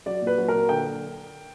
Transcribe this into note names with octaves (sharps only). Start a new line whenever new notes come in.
F#3 D5
A#2
B4
F#3
A#2 A#4
D3 G5